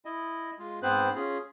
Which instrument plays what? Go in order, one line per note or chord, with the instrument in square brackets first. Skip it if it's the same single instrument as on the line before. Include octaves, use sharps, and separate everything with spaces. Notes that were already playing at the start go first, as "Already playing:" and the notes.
[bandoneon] E4 D#5
G#3 F4
G#2 B3 C4 B4 C5 F#6
C#4 F4 G#4